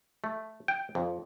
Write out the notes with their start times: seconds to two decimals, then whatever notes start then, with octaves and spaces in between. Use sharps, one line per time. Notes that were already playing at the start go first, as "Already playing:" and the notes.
0.24 A3
0.68 G5
0.95 F2